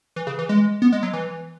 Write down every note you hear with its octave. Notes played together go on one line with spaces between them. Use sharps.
E3
C#3
E3
G#3
B3
G#3
F#3
E3